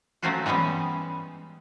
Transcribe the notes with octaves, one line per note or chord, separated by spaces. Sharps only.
F#3 A3 C4 C#4 F4 F#4
E3 G3 G#3 B3 C#4